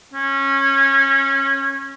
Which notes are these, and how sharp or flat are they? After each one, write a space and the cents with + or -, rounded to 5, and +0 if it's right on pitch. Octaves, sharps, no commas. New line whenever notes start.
C#4 -20